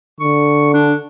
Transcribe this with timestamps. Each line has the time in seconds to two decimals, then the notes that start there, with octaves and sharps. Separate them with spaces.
0.20 D3 C#6
0.74 D4